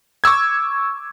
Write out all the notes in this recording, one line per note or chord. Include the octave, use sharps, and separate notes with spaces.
C#6 D6 E6 G#6